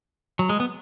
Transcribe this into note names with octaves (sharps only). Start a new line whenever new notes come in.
F#3
G#3
B3